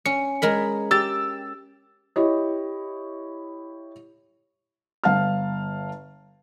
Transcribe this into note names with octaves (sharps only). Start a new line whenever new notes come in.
C#4 C#7
G#3 A#4 B5
G4 E6 A6
E4 G4 C#5 D#5
G1 F5 A5 F6